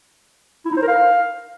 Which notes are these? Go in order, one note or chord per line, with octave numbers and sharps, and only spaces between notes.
E4
D#4
C5
A#4
F5